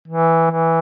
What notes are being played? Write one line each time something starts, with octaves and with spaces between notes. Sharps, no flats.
E3
E3